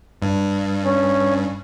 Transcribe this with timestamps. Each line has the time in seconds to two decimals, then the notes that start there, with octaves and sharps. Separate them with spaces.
0.22 G2
0.84 C#4